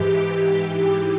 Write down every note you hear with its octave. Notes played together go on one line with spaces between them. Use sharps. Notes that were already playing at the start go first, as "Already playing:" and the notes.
Already playing: G#2 E3 G4